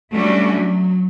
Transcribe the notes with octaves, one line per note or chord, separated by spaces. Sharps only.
G3 A3 C#4 D4 E4 F#4
F#3